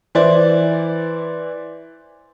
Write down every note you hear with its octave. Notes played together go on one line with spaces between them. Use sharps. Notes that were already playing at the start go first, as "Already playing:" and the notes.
E3 E4 C5 D5